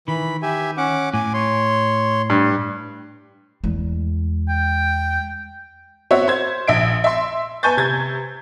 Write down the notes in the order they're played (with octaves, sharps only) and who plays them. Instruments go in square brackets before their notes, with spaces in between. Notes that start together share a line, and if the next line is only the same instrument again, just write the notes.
[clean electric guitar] D#3 [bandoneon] E3 B5
[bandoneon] G4 E5 G#5
C#4 F#5 D6
[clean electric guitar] A2 [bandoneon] G#5 D6
[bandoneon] C#5 C6
[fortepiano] G2
[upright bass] E2 G#3
[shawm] G5
[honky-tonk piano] C4 F#4 C#5 E5
C5 G#6
A#1 E5 D7
E5 C6
B4 G#5 A5 C#6 G6 A6
C3 G#6 A6